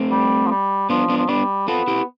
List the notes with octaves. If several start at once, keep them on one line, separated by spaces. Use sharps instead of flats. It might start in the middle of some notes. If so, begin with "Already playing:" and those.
Already playing: A3 C4
G3
F3
G3
F3 B3 D4
B3 D4
F3
G3 B3 D4
B3 F4 A4
E4 G4